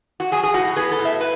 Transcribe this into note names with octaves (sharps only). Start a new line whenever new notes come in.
F#4
F#3 G#4
G#4
A2 F#4
B3 G#4
A4
A2
E5
B4